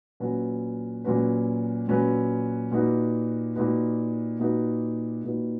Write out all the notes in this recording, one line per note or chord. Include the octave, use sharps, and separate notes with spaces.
A#2 F#3 C#4 F#4 B4
A#2 F#3 C#4 F#4 B4
A#2 F#3 C#4 F#4 B4
A#2 A#3 D#4 F#4 B4
A#2 A#3 D#4 F#4 B4
A#2 A#3 D#4 F#4 B4
A#2 A#3 D#4 F#4 B4